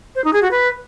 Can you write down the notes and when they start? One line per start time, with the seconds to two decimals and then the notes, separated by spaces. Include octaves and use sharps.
0.15 C5
0.24 D#4
0.33 G#4
0.42 F#4
0.51 B4